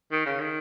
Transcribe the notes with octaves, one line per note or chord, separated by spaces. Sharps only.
D#3
C#3
D#3